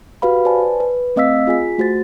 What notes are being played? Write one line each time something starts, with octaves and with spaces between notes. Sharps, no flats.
F#4 G4 B4 F5 B5
B4 C5 D5 G#5 A5
B4
A3 C4 D#5 F5 E6 B6
F4 G#4 G#5 B6
A3 F#4 C5 A6